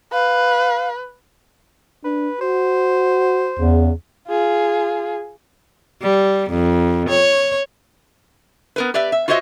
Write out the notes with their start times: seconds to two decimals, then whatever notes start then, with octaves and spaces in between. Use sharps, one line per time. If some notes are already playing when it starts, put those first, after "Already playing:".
0.13 B4 F5
2.04 D4 B4
2.41 F#4 C5
3.60 E2 C#3
4.28 F4 G#4
6.02 G3
6.50 F2
7.09 C#5
8.76 B3 A#4 B4
8.94 G4 B4 D5 E5
9.12 E5
9.28 F4 F#4 C5 C#5 D#5 E5